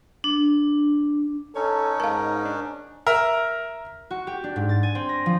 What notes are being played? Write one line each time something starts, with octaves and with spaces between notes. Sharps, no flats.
D4
C#4 D#4 A4 C#5
G#2 A#4 F5 A5
D4
A#4 E5
F#4
G4
D4
G#2
A6
G#5
C4
A#6
F3